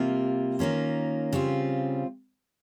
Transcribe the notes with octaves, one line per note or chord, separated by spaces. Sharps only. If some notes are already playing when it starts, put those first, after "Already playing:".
Already playing: C3 G3 A#3 F4
D#3 A#3 C#4 F4
C#3 G3 C4 F4